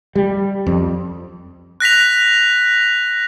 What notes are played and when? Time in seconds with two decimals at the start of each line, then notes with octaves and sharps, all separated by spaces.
0.15 G3
0.67 F2
1.80 F#6 A#6 B6 F7